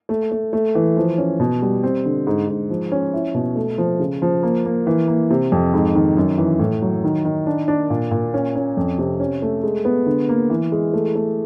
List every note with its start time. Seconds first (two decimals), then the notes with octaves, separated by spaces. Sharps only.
0.09 A3
0.32 A3
0.53 A3
0.75 E3
0.97 F3
1.18 C#4
1.40 B2
1.62 G3
1.83 C4
2.05 D3
2.27 G#2
2.49 G#2
2.70 F3
2.92 C#4
3.13 E4
3.35 B2
3.56 A3
3.78 F3
4.00 C#3
4.22 F3
4.43 A#3
4.65 A#3
4.87 E3
5.08 A#3
5.30 C3
5.52 F2
5.74 G#2
5.95 D#3
6.17 F#2
6.38 E3
6.59 A2
6.82 F#3
7.04 D#3
7.25 D#3
7.46 D4
7.68 D4
7.90 A#2
8.11 A#2
8.34 C#4
8.56 C#4
8.77 F2
8.98 C3
9.20 C#4
9.42 A3
9.63 G#3
9.85 B3
10.06 D3
10.29 A#3
10.50 E3
10.72 G#3
10.93 A3
11.15 A3